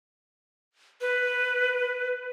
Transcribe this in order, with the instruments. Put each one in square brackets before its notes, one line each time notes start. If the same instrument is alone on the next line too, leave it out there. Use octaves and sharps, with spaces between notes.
[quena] B4